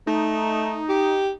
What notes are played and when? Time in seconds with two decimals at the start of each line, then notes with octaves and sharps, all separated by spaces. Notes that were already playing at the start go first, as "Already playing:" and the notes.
0.07 A3 D#4
0.89 G4